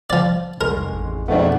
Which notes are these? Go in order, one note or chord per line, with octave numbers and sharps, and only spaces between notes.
F3 D5
F1 C2 G#3 A#4
A1
F2 G#2 B2 A3 B3 D4